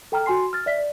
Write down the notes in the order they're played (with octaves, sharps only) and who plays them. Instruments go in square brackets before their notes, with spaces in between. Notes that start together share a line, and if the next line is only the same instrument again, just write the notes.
[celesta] A4 G5 A#5 F6
F#4 G#5 C6 C7
F6 A6
D5 E5 B6
D5